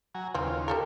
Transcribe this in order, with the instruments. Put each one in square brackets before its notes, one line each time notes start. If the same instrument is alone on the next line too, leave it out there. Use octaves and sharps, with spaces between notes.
[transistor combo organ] F#3 G#5 A#5
[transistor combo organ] D#2 C#3 F4 [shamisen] E3 C4
[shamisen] G4 A4 A#4